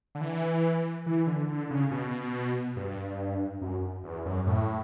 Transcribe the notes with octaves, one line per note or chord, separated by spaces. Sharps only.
D3
E3
E3
D3
D3
C#3
B2
G2
F#2
E2
F#2
A2